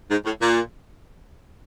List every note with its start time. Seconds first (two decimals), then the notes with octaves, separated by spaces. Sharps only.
0.11 G#2
0.25 A2
0.41 A#2